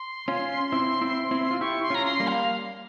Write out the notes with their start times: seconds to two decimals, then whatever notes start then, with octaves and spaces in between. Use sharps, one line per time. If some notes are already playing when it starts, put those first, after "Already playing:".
Already playing: C6
0.28 C#4 F4
0.72 C4 E4
1.01 C4 E4
1.31 C4 E4
1.51 F4
1.61 E4 G4 C#6
1.83 C6
1.90 C#4 F4 A#5
2.05 C6
2.20 G3 A#3
2.28 F5